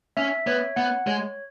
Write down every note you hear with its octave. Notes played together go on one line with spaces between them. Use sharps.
C#4 E5
B3 C#5
B3 F#5
G#3 C#5